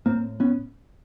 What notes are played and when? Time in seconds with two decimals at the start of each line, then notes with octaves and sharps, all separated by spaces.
0.06 A2 A#3 C4
0.40 B3 C#4